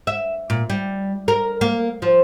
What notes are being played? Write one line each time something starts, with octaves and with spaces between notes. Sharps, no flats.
E5
A#2
G3
A#4
A#3
F3